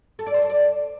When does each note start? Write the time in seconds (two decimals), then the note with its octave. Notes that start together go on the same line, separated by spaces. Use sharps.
0.19 A4
0.26 D5
0.34 C5
0.42 A4
0.50 D5